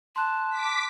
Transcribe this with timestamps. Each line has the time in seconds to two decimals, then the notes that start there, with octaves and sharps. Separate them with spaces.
0.16 A5 C6 F#6
0.50 D6 B6